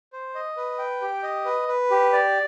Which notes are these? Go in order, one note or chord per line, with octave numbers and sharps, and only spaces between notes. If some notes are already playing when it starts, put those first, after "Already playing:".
C5
D#5
B4
G5
G4
D#5
B4
B4
G4
D5